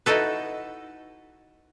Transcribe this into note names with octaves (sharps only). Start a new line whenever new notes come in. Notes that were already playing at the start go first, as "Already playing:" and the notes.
D#4 E4 F#4 A4 B4